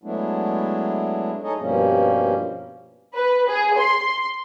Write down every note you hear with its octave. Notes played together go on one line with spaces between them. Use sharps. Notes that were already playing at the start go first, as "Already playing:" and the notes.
F#3 G#3 A3 B3 D4 E4
D#4 G#4 A4 C#5 D#5
G2 B2 F3 G3 A#3 C#4
B4
G#4
C6